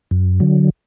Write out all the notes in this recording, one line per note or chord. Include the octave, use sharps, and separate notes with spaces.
F#2
D3 F#3